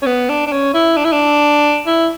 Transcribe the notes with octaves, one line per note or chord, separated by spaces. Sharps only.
C#4
B3
D4
D4
C#4
E4
D4
E4
D4
E4